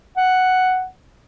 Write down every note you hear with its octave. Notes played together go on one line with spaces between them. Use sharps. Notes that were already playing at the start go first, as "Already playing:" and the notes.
F#5